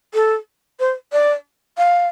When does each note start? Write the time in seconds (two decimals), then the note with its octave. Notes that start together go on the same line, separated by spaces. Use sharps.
0.14 A4
0.80 C5
1.12 D5
1.78 F5